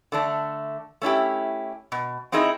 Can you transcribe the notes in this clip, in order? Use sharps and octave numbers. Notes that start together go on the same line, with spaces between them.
D3 A3 D4
A3 C#4 E4 G4
B2
C4 D#4 E4 G#4 D#5